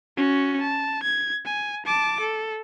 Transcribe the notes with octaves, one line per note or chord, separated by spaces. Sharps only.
C#4 F#4
A5
G#6
G#5
A5 D6
A4